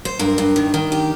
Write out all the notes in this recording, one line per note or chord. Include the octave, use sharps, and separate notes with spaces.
C5
G2 A#4
G2
D#3
D#3
G4